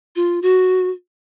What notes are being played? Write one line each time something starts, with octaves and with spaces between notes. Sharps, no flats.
F4
F#4